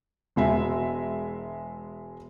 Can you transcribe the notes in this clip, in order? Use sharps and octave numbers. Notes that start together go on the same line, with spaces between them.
E1 G#3 E5